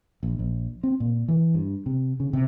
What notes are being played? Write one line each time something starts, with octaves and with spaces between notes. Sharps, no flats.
A#1
A#1
C4
A#2
E3
G2
C3
C#3
C3